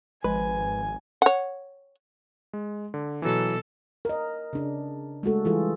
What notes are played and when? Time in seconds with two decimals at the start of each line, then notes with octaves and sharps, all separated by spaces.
0.24 G#1 F3 G#3 B4 G#5
1.22 C#5 F#5
2.53 G#3
2.94 D3
3.22 B2 E3 F#3 A4
4.05 A#4 D#5
4.53 C#3 D4
5.23 G#3 A3 F#4 A4
5.45 E3 G3 F4 G#4 A4